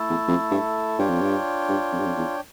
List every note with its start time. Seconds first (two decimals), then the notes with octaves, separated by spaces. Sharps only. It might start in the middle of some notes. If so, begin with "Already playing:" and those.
Already playing: A3 E4 A4
0.09 E2
0.28 F2
0.51 G2
0.99 G2 D4 F4 C#5 G5
1.09 F2
1.21 G2
1.69 G2
1.92 F2
1.99 G2
2.06 F2
2.17 E2